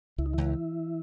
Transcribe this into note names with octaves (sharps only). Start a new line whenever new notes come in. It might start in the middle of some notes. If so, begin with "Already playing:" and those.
C#2 E4
D#4
C#2 E3 E4